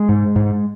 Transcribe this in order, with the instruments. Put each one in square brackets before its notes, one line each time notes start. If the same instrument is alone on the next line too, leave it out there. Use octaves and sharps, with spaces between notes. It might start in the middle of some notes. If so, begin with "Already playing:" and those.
Already playing: [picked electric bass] G#3
G#2
G#2